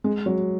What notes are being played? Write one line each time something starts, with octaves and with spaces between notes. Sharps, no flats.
G#3
F#3